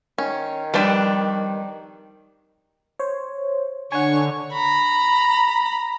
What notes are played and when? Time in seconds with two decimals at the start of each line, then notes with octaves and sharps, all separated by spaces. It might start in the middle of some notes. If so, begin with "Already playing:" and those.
0.18 D#3 C#4
0.74 F2 C3 G3 D4 B4
2.99 C5 C#5
3.92 D3 D4 C#5 F#5 G#5 C#6
4.52 A#5 B5